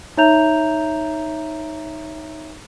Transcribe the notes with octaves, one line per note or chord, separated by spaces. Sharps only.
D#4 C#5 E5 A#5 G6 F7